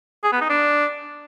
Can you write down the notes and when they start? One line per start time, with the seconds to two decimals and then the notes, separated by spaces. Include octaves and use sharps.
0.24 G#4
0.32 B3
0.41 D#4
0.49 D4